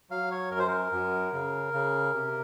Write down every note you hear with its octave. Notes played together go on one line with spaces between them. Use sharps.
F#3 F5
C#5
F#2 A#4
C5
A#4
F#2
C#3
C#3
C3